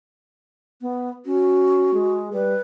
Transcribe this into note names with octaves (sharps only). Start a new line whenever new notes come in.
B3
C#4 F#4
G#3
G3 B4